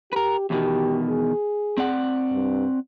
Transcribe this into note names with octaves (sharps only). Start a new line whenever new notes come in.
G4 A#4 B4
E2 B2 D#3 G4
G#4
C4 D5 F#5
G2